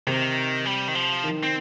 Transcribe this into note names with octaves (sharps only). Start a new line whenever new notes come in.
C3 D#3
G3
D#3
F3
D#3
C4